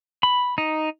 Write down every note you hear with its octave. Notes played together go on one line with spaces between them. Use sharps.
B5
D#4